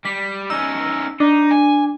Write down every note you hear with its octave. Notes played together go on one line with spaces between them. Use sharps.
G3 B6
C#4 D#4 E6
D4 D#4
G#5